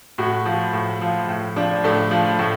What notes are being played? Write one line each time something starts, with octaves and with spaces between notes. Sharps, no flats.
A2 F#4
F3
A2
F3
A2
F3 D4
A2 A3
F3
A2